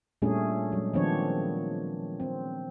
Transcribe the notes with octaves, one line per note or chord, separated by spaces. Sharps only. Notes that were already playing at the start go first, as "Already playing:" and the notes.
A#2 G3 A3 C#4 D4 G#4
F#3 G#3
D#3 F3 B3 C4 D4 C#5
C4